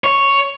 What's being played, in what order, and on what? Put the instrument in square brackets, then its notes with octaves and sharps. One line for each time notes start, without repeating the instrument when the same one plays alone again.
[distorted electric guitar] C#5